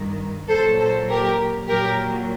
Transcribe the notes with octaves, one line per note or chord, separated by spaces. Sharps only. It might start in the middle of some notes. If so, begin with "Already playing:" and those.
Already playing: G2 D#3
A#2 F#3 A4 C5
A4 C5
G4 A#4
A#2 F#3 G4 A#4